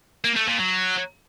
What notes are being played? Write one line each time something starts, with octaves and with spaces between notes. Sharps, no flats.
A#3
A3
A#2
F#3